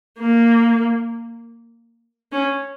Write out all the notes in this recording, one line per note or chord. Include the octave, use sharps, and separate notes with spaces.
A#3
C#4